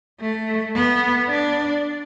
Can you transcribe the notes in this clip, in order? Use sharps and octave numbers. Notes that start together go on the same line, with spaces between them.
A3
B3
D4